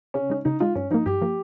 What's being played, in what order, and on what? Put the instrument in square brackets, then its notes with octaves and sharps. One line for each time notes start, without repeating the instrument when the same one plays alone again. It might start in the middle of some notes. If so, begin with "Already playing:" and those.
[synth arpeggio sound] C#3 [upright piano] C#4
[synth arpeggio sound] G#3 D#4
[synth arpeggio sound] C#3 [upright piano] D#4
[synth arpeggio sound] G#3 D#4 [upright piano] F4
[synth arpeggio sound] G2 [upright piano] C#4
[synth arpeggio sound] F3 A#3 [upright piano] D#4
[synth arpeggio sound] G2 [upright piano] G4
[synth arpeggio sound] F3 A#3